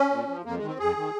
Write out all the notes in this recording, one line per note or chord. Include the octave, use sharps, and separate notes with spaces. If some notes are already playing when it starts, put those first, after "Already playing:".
Already playing: C#4
A#2
F3
F2 A#3
G#3
D#3
C4
F2 G#4
D#3